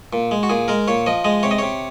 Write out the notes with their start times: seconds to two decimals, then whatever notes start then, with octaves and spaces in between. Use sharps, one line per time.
0.13 A#2
0.31 G#3
0.43 F#4
0.50 A#2 G#4
0.68 G#3 A#4
0.88 A#2 C#5
1.06 F3 D#5
1.24 G#3 D#5
1.43 C3 C#5
1.51 D#5
1.58 C3 C#5